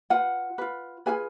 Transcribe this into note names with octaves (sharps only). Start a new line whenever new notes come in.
F4 B4 F#5
F4 B4
F4 G#4 B4 G#5